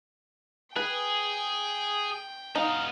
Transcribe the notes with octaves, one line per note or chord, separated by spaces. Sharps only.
G#4 B4 G5
B3 D#4 F5